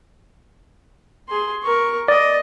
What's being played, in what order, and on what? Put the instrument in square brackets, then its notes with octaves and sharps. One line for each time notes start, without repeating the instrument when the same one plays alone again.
[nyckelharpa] G#4 C6
A#4 C#6
[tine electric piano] D5 [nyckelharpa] D#5